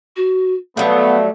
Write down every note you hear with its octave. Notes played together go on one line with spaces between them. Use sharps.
F#4
F#3 G3 A3 B3 F5